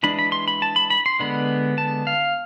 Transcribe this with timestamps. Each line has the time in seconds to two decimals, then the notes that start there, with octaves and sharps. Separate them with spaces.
0.03 E3 G#3 D4 B5
0.19 B5
0.32 C6
0.48 B5
0.62 A5
0.76 B5
0.90 B5
1.06 C6
1.19 D3 G#3 B3 D4 B5
1.78 A5
2.07 F5